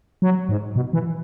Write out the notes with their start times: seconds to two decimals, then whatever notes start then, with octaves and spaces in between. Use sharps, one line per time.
0.22 F#3
0.49 G#2
0.76 B2
0.93 E3